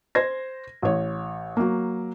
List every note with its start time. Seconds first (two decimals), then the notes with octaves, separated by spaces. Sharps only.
0.15 C5 G#6 A#6
0.82 A1 C#5
1.57 F#3 A#3